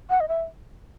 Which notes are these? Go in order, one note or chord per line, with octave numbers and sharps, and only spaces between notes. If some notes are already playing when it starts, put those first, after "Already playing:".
F#5
D#5
E5